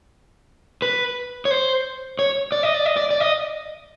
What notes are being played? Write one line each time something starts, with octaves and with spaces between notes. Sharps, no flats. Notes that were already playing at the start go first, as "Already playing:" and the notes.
B4
C#5
C5
C#5
D5
D#5
D5
D#5
D5
D5
D#5